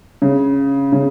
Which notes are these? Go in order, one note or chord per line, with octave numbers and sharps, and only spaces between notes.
C#3
C#3